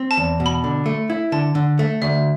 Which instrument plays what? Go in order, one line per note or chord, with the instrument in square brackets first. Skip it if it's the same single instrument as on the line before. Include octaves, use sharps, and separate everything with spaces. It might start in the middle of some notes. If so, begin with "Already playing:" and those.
Already playing: [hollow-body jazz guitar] C4
[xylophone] A5
[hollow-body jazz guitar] E2
B2
[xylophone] B5
[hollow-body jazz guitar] D3
A3
E4
[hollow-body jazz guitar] D3 [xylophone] A5
[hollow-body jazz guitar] D3
A3
[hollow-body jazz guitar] D2 [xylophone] E5